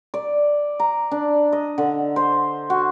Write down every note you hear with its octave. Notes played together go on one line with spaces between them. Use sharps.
D5
A#5
D4
D#5
D3
C5
F#4